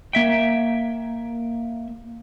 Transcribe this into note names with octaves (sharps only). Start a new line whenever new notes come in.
A#3 E5 G5